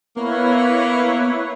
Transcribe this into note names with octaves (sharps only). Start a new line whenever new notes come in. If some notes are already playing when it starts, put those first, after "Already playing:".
A#3 B3 E4 B4 C#5